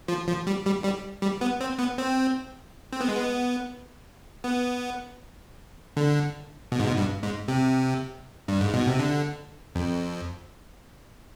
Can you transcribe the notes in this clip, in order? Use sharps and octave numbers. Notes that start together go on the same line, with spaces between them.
F3
F3
G3
G3
G3
G3
B3
C4
B3
C4
C4
B3
G#3
B3
B3
D3
B2
G#2
B2
G2
G#2
C3
G2
G#2
B2
C3
D3
F2